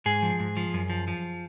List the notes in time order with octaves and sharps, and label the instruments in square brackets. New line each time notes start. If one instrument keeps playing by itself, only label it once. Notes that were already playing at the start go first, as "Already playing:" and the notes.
[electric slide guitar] G#2 G#4
F3
G#2
F3
F#2
F3
F3